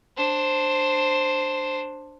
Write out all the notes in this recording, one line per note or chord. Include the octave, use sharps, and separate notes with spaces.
D4 C5